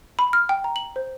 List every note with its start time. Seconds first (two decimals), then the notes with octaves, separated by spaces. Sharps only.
0.19 B5
0.33 F6
0.49 G5
0.64 A#5
0.76 F#7
0.96 C5